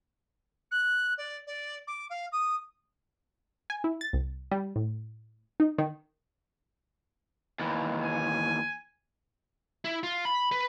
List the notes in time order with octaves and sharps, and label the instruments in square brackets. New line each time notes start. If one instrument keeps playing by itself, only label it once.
[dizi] F#6
D5
D5
D6
F5
D#6
[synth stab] G#5
E4
A6
C2
G3
A2
D#4
D#3
[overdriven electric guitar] D#2 E3
[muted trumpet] G#5
[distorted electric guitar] E4
F4
B5
B4